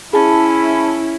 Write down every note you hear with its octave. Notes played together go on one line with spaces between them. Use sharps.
C#4 E4 G#4 A5 B5